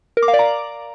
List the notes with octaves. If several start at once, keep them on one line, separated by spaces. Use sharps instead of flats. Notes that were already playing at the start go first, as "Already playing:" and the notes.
A#4
D6
F5
D5
A#5